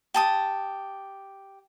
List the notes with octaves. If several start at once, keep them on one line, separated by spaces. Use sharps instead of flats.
G4 A5 D#6